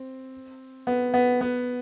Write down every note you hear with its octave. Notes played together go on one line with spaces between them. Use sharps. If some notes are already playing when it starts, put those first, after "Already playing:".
Already playing: C4
B3
B3
B3